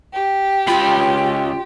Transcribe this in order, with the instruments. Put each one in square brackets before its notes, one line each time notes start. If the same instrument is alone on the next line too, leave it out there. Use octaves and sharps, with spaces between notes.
[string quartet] G4
[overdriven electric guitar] C#2 B5 [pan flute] F4